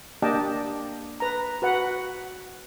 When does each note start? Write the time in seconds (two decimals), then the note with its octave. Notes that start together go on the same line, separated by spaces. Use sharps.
0.22 A#3 D4 G4 D#5 G5 A5
1.20 B4 A#5
1.62 F#4 B4 F#5